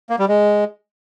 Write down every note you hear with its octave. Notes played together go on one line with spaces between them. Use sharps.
A#3
G3
G#3